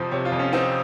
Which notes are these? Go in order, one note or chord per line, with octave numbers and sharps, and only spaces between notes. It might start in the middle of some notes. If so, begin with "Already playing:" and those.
Already playing: F2 C3 F3 C4
C3 C#5
F4
F2
C#4
C4 D#4